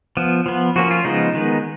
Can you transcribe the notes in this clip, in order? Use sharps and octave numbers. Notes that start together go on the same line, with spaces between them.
F3 B3
F3 B3
F3 A#3 C#4 F#4
F4
C#3 F3 G#3 B3 D#4
D#3 G#3 B3